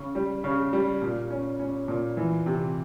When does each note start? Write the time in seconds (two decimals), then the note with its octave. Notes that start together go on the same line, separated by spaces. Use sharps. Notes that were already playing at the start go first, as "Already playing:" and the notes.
Already playing: C#3
0.15 G3
0.44 C#3
0.73 G3
1.02 A#2
1.30 C#4
1.60 C#4
1.88 A#2
2.17 E3
2.46 C3